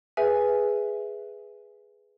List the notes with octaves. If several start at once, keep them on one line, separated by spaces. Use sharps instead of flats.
G#4 B4 E5 G#5